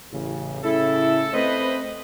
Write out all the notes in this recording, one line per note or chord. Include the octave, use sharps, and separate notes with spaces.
A1 C#3
A2 C#3 E4 A4
A3 C4 B4 C5 D#5